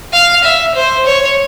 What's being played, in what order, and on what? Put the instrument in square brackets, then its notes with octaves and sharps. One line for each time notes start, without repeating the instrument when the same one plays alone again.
[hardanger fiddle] F5
E5
C5
C#5